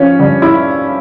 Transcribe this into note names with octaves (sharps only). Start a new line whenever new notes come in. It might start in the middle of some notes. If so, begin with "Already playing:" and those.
Already playing: F3 C#4
G2
E4